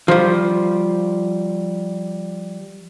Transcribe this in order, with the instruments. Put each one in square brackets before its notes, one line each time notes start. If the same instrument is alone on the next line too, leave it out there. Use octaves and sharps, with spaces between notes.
[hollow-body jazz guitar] F3 G3